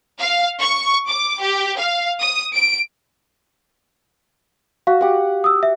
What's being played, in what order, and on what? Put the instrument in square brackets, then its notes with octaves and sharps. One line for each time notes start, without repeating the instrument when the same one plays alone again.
[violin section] F5
C#6
D6
G4
F5
D#6
D7
[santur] F#4 [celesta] F5
[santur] G4 F#5
[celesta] D#6 E6
E5